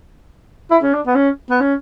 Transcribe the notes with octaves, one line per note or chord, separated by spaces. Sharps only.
E4
C#4
D4
B3
C#4
B3
C#4